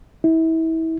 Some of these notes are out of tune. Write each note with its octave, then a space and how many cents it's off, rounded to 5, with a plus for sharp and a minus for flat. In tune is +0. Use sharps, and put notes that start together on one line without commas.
E4 -30